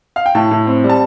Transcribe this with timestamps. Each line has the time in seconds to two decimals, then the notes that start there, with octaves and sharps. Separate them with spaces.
0.16 F5
0.26 G5
0.35 A2 A5
0.51 A2
0.67 C4
0.84 G3
0.89 A5